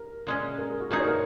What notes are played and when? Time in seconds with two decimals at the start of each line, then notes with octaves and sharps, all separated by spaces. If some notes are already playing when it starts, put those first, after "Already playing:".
Already playing: A#4
0.27 A#2 G#3 C#4
0.58 A#4
0.69 G#4
0.80 F#4
0.91 A#2 A#3 D#4 G#4 A#4
1.00 C#5
1.08 A#4